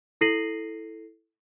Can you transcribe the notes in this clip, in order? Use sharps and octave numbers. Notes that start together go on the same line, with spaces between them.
E4 A4 A#6 C7 D#7 F#7